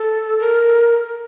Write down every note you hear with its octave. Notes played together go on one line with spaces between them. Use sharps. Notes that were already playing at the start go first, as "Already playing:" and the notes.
Already playing: A4
A#4